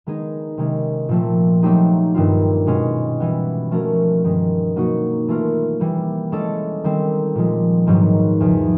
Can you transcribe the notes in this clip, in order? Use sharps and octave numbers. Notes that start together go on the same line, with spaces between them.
D#3 G#3 B3 D#4 G#4
C3 D#3 G#3 C#4
A#2 F3 A3 C4
F#3 A3 C4 D#4 G4
G2 D#3 G3 C4 F4
B2 G#3 C#4
E3 G3 B3
F3 A3 C#4 F#4 A#4
G2 D#3 G#3
B2 F#3 A#3 D#4 F#4
E3 A3 C#4 F4 A#4
E3 G3 A#3
G#3 C#4 E4 A4 D5
D#3 G3 C4
A#2 F3 G#3
G#2 D#3 F#3 B3 D#4
E2 C#3 F3